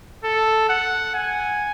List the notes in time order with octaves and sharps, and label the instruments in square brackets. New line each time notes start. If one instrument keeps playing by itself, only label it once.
[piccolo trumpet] A4
F#5
G#5